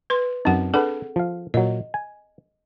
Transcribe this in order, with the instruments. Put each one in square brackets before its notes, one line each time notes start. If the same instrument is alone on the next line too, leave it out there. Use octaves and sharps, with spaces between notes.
[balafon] B4 C6
[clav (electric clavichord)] F#2 D#4 [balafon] C4 F#5
[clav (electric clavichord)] D4 B4 [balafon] G#4 A4 F#5
[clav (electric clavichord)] F3 F5
[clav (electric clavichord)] A#2 F#3 [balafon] D#5
[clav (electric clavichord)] G#5